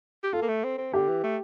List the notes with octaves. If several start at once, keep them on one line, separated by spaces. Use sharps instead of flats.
G4
F4 A4
A#3
A3
C4
C4
D3 G4
E3
A3